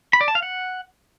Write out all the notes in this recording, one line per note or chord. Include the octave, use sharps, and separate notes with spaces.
B5
D5
A5
F5
F#5